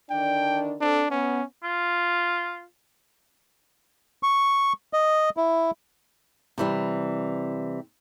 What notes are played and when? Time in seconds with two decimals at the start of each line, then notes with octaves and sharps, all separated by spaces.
0.10 D3 D#3 D4 G5
0.81 C4 D4 A4
1.11 B3 C#4
1.64 F4
4.23 C#6
4.93 D#5
5.37 E4
6.58 C3 E3 G3